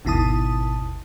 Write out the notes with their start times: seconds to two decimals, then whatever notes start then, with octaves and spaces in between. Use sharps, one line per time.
0.05 G#1 D#2 B2 E4 A5 D#6